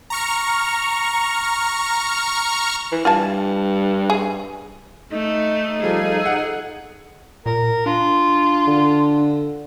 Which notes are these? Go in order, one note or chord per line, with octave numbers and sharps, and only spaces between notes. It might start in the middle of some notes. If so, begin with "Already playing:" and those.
A#5 C#6 F6
E3
G2 F4 G#5 A5
G#4
A3 D#4
F3 G3 F4 G#4 A4
F#5
A#2 A#4
D4 F4
D3